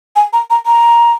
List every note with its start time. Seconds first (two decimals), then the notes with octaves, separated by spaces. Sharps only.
0.16 G#5
0.33 A#5
0.50 A#5
0.66 A#5